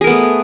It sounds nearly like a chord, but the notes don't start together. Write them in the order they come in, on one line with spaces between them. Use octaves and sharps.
G#4 A#4 B3 A3